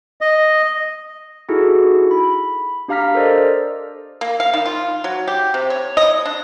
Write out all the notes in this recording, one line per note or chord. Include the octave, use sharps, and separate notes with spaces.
D#5
D#4 E4 F#4 G#4 A4
B5
D4 G4 F5 A#5 F6 B6
A4 A#4 C5 D5 D#5
A#3
F5
D#3
F4
F#3
G4
C3
C#5
D#5
D4